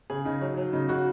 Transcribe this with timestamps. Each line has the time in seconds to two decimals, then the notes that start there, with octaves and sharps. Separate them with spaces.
0.10 C#3 G#4
0.25 C#3 D#4
0.41 F#3
0.57 F#3
0.73 C#3 D#4
0.88 C#3 F#4